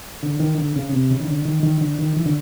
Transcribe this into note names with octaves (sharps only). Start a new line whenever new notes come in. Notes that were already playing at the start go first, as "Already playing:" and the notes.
D3
D#3
D3
C#3
C3
C#3
D#3
D3
D#3
D#3
D3
D#3
E3
D3